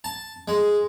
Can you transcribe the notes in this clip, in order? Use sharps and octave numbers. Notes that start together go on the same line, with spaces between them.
A5
G#3